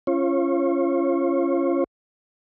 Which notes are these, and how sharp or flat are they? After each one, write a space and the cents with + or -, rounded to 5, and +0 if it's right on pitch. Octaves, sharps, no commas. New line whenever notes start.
C#4 +0 F4 -30 C#5 -35